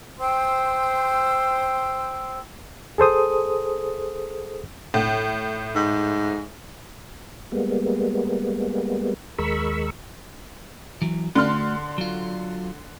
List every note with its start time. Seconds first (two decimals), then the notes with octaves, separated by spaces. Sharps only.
0.19 C5 G5 C6 E6
2.98 G#4 A4 C5 D#6
4.94 A2
5.75 G#2
7.52 G3 G#3 A#3 B3
9.39 D#2 G#3 A#4 B5 C#6 E6
11.02 E3 F#3
11.35 D3 A3 F#4 C6 F6
11.98 F#3 F4